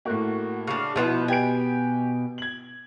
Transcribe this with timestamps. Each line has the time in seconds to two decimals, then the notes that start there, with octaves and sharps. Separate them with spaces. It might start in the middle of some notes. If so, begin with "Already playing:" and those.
0.05 A2 A#3 F#4
0.67 C#3 D4 F5
0.96 B2 F3 B3 E4 C5
1.28 G4 B4 G#5 D7
2.38 G#6 F#7